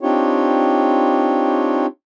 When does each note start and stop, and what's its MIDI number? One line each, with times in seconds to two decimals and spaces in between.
0.01 1.86 60
0.01 1.86 62
0.01 1.86 63
0.01 1.86 65
0.01 1.86 67
0.01 1.86 73